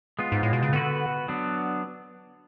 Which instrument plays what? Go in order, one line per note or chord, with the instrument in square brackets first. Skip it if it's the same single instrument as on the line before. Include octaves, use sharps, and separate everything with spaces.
[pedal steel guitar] G#3 B3 F4
[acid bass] G#2
A2
B2
C#3
[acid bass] D3 [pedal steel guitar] B3 F#4 B4
[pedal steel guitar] F#3 B3 D4